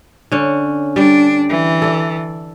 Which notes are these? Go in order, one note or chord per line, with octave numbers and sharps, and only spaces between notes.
D3 C#4
G3 D4
E3
A4 D5